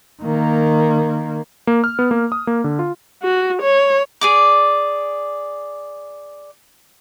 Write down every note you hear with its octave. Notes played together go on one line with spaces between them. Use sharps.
D#3 A#3
A#3
F6
B3
A#3
D#6
A#3
D3
F4
F#4
C#5
G#4 D5 D6